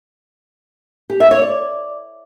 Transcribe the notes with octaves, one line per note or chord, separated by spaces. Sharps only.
G4
E5
C#5
D5